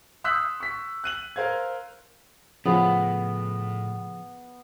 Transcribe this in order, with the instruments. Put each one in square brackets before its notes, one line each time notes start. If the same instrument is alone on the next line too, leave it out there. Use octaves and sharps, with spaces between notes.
[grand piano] C6 D#6 E6 F#6 G6 B6
C#6 B6
F#6 D#7 F#7
A#4 C5 F5 G#6
[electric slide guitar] A2 [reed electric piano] C#3 F3 G#4 [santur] B3